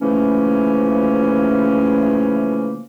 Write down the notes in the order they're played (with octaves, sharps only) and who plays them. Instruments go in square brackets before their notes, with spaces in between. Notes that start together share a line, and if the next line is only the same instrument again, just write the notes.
[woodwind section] C#3 E3 F3 A3 A#3 C#4